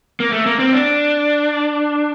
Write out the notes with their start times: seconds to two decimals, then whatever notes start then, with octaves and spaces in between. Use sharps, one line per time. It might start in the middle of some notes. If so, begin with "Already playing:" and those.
0.20 A#3
0.33 A3
0.46 A#3
0.59 C4
0.73 D4